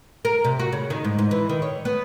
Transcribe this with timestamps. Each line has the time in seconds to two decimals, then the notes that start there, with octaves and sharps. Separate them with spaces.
0.25 A#4
0.44 C3
0.59 F#4
0.73 C#3
0.90 D#3
1.04 G#2
1.19 G#2
1.31 E3
1.49 D#3
1.62 C#5
1.85 B3